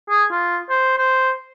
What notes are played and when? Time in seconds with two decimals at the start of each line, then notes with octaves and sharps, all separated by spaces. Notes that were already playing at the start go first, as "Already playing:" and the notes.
0.09 G#4
0.31 F4
0.70 C5
0.98 C5